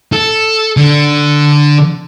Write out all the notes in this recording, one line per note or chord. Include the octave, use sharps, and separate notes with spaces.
A4
D3